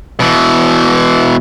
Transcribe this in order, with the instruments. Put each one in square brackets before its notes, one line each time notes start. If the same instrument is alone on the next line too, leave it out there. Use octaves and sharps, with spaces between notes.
[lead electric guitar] B2 E3